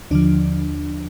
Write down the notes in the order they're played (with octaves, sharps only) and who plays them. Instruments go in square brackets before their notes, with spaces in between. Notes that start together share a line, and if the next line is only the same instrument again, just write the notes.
[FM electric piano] D#2 D3 F3 D4